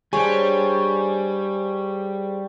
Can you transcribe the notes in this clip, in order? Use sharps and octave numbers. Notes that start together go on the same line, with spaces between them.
G3 D4 G#4 C5 C#5 G#5